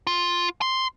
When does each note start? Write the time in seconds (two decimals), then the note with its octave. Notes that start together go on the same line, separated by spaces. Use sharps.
0.07 F4
0.61 C6